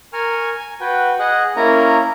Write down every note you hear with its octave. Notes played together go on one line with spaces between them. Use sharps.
A#4 G#5 C#6 F6
G#5
F#4 B4 G5
G#4 D#5 F#5
A#3 C#4 E4 A#4 C#5 A#5